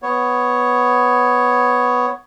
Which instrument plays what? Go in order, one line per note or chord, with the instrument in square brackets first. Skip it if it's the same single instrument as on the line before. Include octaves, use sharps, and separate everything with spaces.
[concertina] B3 C#5